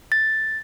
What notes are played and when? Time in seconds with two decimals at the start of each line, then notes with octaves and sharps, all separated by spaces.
0.12 A6